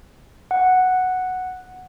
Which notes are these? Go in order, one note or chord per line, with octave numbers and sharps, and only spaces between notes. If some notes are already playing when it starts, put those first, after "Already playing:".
F#5